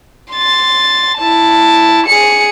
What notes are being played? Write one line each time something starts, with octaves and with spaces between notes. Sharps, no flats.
C6 A6
E4 A5
G#4 C#7